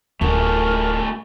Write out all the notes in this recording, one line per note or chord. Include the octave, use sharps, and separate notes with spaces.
D1 A3 F4 F#4 G#4 A#4